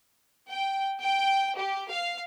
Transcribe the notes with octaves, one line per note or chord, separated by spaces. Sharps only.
G5
G5
G4
F5